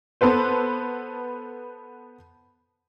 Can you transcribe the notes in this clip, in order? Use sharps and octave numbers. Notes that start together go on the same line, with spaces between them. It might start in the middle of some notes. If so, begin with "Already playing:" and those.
B3 A4 B4 C5